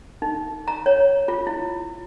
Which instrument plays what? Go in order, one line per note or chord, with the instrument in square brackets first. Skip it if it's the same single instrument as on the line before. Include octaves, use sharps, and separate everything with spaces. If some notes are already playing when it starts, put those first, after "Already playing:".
[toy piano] D#4
A#5
C#5
F4
E4